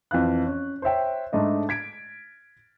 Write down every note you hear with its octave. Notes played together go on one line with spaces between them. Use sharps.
F2 E3 F5 F#6
C#4
C5 C#5 E5 G5
G#2 A3 D4 D#5 E5
G#6 B6 D7